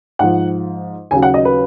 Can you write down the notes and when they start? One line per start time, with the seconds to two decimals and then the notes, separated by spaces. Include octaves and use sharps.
0.19 G#2 F3 F#5
1.11 D#2 C#3 F#3 G#5
1.23 F#5
1.34 D#5
1.45 B4